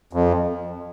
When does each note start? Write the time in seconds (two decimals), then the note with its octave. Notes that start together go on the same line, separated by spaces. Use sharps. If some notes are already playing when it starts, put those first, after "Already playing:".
0.13 F2